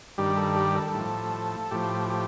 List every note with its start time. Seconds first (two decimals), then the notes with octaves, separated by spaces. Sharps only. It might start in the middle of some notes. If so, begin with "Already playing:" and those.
0.18 G2 D#3 G3 G4
0.37 A4
0.56 G4
0.75 A4
0.94 A2 F3
1.71 A2 F3 G4
2.10 G4